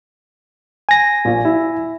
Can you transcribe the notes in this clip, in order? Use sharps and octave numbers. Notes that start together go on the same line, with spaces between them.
G#5 A#6
A#1 A#2
E4